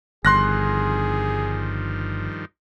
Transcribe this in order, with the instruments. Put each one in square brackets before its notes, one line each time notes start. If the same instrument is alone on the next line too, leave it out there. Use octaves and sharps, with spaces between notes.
[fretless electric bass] G1 [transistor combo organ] G2 D#3 F3 [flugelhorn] G#4 [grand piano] C6 F#6 A#6